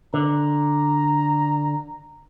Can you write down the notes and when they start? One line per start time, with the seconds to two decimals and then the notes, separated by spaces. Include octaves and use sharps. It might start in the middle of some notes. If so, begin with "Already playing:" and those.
0.14 D3 A#5